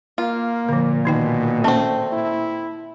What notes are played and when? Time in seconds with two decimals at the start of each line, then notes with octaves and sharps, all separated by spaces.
0.18 A#3 F4
0.69 A#2 D3 F3
1.05 B2 D#3 D#4 G5
1.64 A3 A#3 C4 C#4 A5
2.12 E4